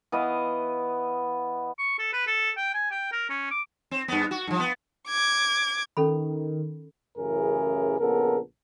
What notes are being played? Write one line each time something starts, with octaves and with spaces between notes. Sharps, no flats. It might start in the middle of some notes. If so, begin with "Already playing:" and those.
E3 B3 D#5 F5
C#6
A4
B4
A4
G5
G#5
G5
A#4
C#4
D6
C4
G2 B3
F#4
G2 F3
B3
D6 G#6
D#3 C#4 A4 B5
A1 F#2 C#3 E3 G#4 A#4
A#1 C#3 B3 A4 A#4